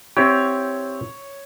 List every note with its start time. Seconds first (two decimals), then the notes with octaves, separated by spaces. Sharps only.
0.17 C4 E4 G4 C#5